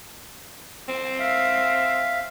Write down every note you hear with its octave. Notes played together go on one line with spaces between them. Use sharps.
C4
E5 F5